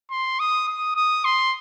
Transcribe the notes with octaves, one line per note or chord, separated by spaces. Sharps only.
C6
D#6
D#6
D#6
C6